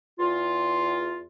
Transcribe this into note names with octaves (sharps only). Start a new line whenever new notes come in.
E2 F4